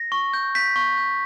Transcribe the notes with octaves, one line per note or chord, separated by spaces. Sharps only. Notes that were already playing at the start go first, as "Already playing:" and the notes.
Already playing: A#6
C#6
G6
G6 B6
C#6
G6